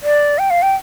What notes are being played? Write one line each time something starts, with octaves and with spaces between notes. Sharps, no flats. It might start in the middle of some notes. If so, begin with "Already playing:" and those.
D5
G5
F5
G5